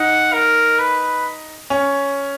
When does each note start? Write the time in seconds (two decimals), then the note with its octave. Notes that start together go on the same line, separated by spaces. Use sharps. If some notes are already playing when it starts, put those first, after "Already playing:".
Already playing: D#4 F#5
0.33 A#4
0.79 B4
1.70 C#4